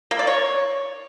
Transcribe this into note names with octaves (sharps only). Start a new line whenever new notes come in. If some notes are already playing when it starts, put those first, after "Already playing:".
A#3
D5
C#5